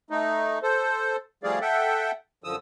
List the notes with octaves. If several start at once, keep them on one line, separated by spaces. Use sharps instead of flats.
A3 D#4
A4 C5
F3 G3 A3 G#4 D5 F5
A4 E5 F#5 G5
F#2 D3 F3 D#6 E6